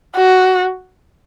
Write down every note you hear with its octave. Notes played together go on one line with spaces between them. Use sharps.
F#4